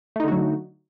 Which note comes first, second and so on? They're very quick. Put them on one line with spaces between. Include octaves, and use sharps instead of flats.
A3 D#4 D3 F#4 F#3